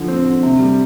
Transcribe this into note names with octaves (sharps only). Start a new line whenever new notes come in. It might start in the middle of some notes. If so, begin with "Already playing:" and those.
Already playing: D3 F3
C4
D3
C3
G3